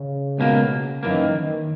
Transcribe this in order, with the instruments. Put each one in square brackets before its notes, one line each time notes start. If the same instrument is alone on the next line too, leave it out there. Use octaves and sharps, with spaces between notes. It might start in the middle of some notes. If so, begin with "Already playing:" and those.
Already playing: [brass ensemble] C#3
[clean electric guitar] C#2 B2 A#3
[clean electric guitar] F#2 E3 A#3 [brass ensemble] D#3
[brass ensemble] D#3